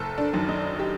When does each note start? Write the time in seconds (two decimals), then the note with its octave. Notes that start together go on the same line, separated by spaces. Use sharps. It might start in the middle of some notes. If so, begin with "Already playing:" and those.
Already playing: F#1 A4
0.18 D4
0.33 F#2 D#3
0.49 D#4
0.79 G4